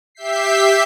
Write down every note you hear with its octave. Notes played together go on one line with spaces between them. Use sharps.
G4 E5 G6 B6 C7